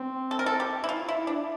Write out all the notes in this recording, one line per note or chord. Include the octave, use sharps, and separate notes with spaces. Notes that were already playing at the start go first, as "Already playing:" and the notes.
Already playing: C4
A4
A#4
A4
G4
E4
F4
E4
D4